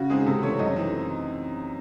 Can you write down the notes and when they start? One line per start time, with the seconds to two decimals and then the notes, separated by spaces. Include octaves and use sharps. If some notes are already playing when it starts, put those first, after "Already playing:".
Already playing: C#3 F#4
0.10 G#3 C4 D#4 G#4
0.26 C3 A4
0.42 E3 A3 C4 C#5
0.59 F#2 D#5
0.76 E3 C4 D#4